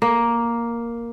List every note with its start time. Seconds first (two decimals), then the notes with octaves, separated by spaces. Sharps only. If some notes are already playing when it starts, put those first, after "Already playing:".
0.02 A#3